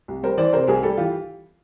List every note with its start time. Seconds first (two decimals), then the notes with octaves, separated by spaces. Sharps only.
0.08 C2
0.23 G3 A#4 C5
0.38 E3 C5 D5
0.53 C3 A#4 C5
0.67 C2 G#4 A#4
0.83 G3 G4 A4
0.98 E3 F4 G4